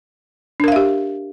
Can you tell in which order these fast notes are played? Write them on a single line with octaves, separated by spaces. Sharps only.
D4 A#4 F5 E5 G4